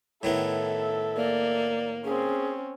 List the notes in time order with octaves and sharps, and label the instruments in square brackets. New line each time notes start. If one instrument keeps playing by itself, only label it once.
[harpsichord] A2 D#3 B3 [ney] E4 [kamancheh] A4 E5
[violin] A#3 [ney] D5
[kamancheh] C4 C#4 [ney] G#4